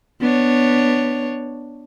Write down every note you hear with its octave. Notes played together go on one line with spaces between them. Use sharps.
B3 D4 C#5